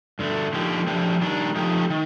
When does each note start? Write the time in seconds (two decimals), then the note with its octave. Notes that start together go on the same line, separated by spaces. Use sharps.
0.19 G2 D3 A3
0.53 D3 F3 A#3 D#4 G4
0.87 F3 A3 D4 G4
1.21 D#3 G3 D4
1.56 F3 A3 D#4 G4
1.90 D#3